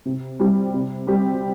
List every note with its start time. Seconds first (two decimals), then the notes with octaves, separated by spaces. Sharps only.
0.05 C3
0.40 G3 C4 G4
0.73 C3
1.07 G3 C4 G4